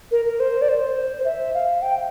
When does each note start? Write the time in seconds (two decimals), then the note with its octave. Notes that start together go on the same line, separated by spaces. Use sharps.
0.11 A#4
0.25 A#4
0.40 C5
0.62 D5
0.68 C5
1.25 E5
1.54 F5
1.82 G5